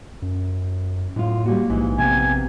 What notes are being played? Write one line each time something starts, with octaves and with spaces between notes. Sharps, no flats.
F#2
F#2 A2 F4
G3 A#3 F#4
A#1 G#2 E3
C3 A#3 B3 G#5